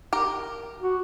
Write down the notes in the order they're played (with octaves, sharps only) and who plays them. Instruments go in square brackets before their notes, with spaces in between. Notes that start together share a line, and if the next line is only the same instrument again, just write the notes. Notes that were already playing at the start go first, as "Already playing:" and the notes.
[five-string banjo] G4 A#4
[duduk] F#4